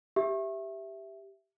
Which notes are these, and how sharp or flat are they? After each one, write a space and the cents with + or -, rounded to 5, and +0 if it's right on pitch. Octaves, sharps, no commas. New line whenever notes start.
G4 +0 E5 +0